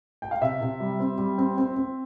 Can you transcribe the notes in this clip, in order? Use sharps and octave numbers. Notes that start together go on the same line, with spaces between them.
G5
F5
C3 E5
C3
G3
C4
G3
C4
C4
C4